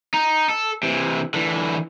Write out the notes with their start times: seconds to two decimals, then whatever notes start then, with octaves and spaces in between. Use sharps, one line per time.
0.14 D#4
0.49 A4
0.83 C3 E3
1.34 D3 E3